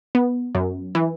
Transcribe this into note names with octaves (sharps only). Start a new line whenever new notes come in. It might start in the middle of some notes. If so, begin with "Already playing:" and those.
B3
F#2
E3